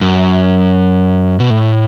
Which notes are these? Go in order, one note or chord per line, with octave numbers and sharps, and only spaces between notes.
F#2
B2
A2